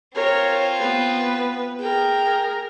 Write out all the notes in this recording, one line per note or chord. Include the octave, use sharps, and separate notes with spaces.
C4 F4 A#4 C#5
B3 B4
G#4 A#4 G5